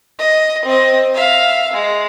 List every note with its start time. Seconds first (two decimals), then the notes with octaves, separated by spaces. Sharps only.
0.19 D#5
0.65 C4 D#5
1.14 E5 F5
1.74 G#3